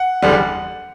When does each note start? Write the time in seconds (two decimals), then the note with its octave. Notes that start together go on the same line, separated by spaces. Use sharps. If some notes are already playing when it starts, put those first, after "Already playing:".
Already playing: F#5
0.22 F#1 E2 D3 G3